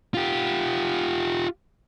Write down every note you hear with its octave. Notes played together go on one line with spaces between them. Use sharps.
F4 G4